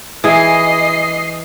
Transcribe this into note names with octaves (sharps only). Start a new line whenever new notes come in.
E3 G#4 D#5 C7